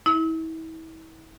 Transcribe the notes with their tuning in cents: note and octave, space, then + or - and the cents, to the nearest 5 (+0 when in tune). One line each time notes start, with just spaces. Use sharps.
E4 -35